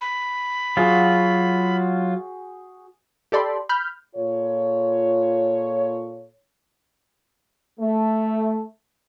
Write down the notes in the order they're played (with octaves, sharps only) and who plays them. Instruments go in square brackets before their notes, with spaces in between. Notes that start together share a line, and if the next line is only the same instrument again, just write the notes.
[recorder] B5
[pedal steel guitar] F#3 F4 [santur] F#4 G#4 G5
[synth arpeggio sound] G4 A4 D5 B5 C6
B5 F6 G6
[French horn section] A#2 F4 A4 C#5
[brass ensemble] A3